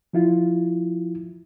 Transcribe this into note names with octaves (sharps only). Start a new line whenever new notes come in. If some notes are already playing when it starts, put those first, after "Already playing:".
F3 E4 F4